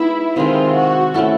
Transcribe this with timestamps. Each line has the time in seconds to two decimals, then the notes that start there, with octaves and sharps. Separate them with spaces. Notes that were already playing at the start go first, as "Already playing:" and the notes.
Already playing: G#3 B3 D#4 E4
0.35 C3 D#3 G#3 F4
0.76 F#4
1.14 A3 C#4 E4 A4